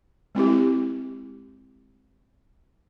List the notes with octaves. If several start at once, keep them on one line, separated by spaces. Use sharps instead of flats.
G#3 C4 E4 G4